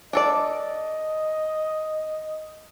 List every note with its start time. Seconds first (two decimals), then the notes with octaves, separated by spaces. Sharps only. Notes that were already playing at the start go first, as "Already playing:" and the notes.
0.13 D4 A4 D5 D#5